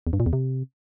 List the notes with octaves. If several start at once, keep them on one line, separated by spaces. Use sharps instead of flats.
E2
G2
A#2
E2
C3